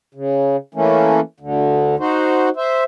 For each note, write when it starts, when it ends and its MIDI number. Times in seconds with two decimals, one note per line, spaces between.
0.15 0.56 49
0.74 1.20 52
0.74 1.20 57
0.74 1.20 58
0.74 1.20 61
1.40 1.96 38
1.40 1.96 50
1.99 2.49 63
1.99 2.49 66
1.99 2.49 72
2.56 2.84 72
2.56 2.84 76